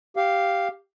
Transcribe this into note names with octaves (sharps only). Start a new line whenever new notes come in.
G4 F5